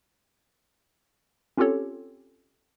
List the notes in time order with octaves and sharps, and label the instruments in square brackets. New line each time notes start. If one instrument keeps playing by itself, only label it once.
[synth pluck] C4 C#4 F4 G4 A4 C#5